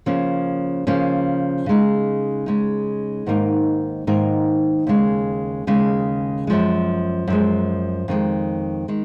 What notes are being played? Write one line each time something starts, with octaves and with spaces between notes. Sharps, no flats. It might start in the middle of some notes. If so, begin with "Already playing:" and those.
C#3 F3 A#3 C#4
C#3 F3 A#3 C#4
C#3 G#3 D#4
C#3 G#3 D#4
G#2 D#3 A#3 D#4 A#4
G#2 D#3 A#3 D#4 A#4
D#2 C#3 G#3
D#2 C#3 G#3
F#2 F3 G#3
F#2 F3 G#3
F2 D#3 G#3
D#3 G#3